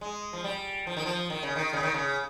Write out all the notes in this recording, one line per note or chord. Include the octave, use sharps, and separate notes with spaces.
G#3
F3
G3
F3
D#3
F3
D#3
C#3
D#3
C#3
D#3
C#3